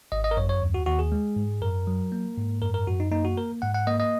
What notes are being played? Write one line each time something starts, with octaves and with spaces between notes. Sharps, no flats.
G#1 D#5
D#5
A#4
F#2 C#5
C#5
D#2
F#4
D#2 F#4
G#4
G#3
G#2
F#2 A#4
F#3
A#3
G#2
F#2 A#4
A#4
F#2 F#4
D#4
A#3 D#4
F#4
A#3 A#4
G#2 F#5
F#5
A#3 D#5
D#5